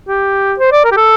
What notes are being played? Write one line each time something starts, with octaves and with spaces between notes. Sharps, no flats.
G4
C5
D5
A#4
G4
A4